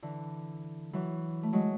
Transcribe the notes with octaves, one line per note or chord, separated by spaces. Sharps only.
D3 E3
E3 F#3
A3
F#3 G#3